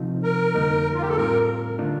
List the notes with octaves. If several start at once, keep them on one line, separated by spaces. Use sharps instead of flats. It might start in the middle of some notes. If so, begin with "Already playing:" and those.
Already playing: C3 F3 C4 D#4
A#4
F2 D3 G3 A#3 D#4
F4
G4
A4
A2 G3 C4 F4 A#4
D3 A3 D4 F4